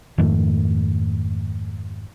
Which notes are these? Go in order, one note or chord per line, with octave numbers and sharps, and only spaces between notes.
F2 G#2 D#3 A3